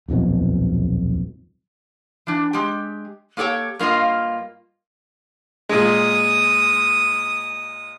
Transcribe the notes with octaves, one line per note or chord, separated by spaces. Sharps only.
D#1 B1 F2 B2
E3 D4
G#3 G4
A#3 G4 A4 C#5 G5
G2 A#3 F4 D#5 F5
A#2 G#3 D#6